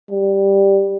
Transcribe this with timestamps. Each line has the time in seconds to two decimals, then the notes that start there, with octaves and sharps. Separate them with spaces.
0.11 G3